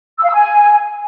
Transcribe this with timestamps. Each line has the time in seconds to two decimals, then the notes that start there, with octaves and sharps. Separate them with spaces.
0.18 E6
0.23 F5
0.29 E6
0.34 G#5